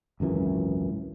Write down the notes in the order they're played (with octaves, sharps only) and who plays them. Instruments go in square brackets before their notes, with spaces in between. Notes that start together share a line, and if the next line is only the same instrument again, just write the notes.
[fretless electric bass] G#1 C#2 F#2 E3